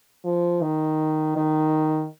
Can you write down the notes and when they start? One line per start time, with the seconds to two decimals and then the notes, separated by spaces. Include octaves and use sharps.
0.25 F3
0.61 D#3
1.37 D#3